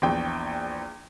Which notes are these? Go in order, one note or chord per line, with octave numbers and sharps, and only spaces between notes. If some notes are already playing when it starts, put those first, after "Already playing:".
A#1 E2 G5